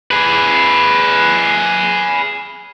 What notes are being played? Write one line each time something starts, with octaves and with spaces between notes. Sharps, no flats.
G#4 B4